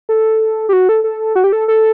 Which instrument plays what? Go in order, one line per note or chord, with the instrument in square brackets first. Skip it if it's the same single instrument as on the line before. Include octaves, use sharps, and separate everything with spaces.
[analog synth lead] A4
G4
F#4
A4
A4
F#4
G4
A4
A4